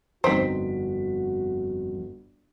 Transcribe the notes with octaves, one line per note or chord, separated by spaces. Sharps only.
G1 F2 C4 D#4 F#4 C5 B6 D7